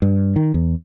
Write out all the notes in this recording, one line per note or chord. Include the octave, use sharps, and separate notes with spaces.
G2
D#3
E2